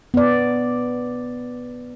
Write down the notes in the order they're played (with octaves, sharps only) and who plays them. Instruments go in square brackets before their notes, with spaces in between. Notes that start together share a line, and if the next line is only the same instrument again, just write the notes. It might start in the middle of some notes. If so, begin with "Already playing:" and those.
[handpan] B3 D5